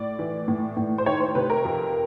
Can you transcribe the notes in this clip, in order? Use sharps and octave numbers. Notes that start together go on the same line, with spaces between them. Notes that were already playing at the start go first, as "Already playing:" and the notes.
Already playing: A2 D5
E3
A2
A2
C5
D#3 C#5
C5
C3 B4
A#4
F2